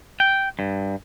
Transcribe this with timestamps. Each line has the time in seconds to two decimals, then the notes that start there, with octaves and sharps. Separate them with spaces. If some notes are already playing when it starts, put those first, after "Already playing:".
0.20 G5
0.59 G2